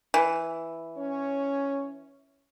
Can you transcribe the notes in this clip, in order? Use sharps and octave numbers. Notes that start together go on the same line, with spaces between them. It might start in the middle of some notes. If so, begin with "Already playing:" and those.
E3
C#4 C#5